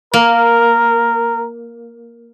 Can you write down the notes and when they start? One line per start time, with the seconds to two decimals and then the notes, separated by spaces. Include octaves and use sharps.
0.14 A#3 A#4